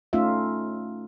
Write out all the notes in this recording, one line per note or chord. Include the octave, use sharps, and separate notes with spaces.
A3 C#4 D#4 F4 E5